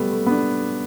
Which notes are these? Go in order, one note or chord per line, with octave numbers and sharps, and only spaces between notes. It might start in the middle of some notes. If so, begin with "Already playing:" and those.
Already playing: G3 A3 B3
A3
B3
D4